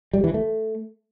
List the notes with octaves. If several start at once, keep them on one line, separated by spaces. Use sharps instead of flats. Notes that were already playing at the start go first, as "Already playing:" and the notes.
G3
E3
A3